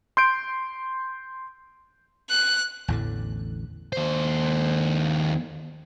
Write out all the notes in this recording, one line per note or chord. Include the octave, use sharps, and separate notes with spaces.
C6 G6 D7
F#6
A1 E2 A2 D3
D#2 C5